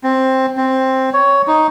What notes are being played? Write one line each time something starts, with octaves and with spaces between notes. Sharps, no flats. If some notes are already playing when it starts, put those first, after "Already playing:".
C4
C4
C#5
D#4